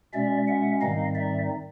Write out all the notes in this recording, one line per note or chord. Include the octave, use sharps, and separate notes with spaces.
B2 G#3 C#4 D5 E5
E5 F#5
G#2 D#3 G3 C4 D#4 D#5 F5
D5 E5